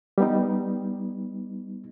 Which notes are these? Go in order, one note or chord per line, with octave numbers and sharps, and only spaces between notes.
G3 B3 D#4